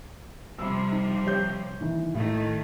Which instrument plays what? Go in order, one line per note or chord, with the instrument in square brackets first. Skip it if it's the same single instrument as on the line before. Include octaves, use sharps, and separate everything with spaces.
[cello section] C3 F3 G3 [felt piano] B5 E6
[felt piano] D#4
G4 C#5 G6
D#3 E3 D#4
[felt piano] A2 [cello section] D#3 A3